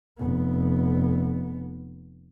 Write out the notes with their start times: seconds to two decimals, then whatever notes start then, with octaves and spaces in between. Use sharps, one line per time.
0.18 F1 B3